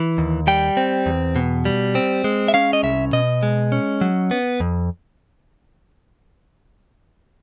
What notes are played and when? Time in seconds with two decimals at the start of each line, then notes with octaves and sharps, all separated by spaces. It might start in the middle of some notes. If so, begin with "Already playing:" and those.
Already playing: E3
0.18 D#2
0.47 G3 G5
0.77 C4
1.06 E2
1.36 B2
1.65 G3
1.95 C4
2.24 G#3
2.48 E5
2.54 C#4 F5
2.73 D#5
2.83 C2 E5
3.13 B2 D#5
3.43 G#3
3.72 C#4
4.01 F#3
4.31 B3
4.60 F2